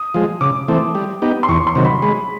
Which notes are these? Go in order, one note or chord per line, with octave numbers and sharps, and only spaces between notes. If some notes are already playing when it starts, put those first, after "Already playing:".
Already playing: D#6
F3 G#3
C#3 D6
E3 A3 C4
G3
B3 D#4 G4
C6
E2 C#6
C6
C3 D#3 F#3
B5
G#3 B5